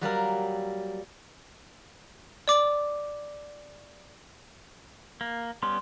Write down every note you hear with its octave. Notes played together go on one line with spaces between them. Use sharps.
F#3 G3 A#3 A#4
D5 D6
A#3
G3 B3 C#4 C6